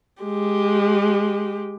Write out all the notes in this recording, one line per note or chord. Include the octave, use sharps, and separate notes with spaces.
G#3 G4